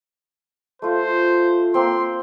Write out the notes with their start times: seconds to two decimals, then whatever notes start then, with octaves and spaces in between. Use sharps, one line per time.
0.82 A3 F4 C5
1.74 A#3 C4 C6